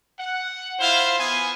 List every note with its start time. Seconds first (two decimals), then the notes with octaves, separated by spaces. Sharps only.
0.19 F#5
0.80 E4 F4 C5 F5
1.19 B3 G#5